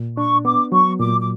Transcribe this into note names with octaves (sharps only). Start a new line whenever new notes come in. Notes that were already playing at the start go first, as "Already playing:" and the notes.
Already playing: A#2
D4 C#6
B3 D6
F#3 C#6
A#2 D6
D6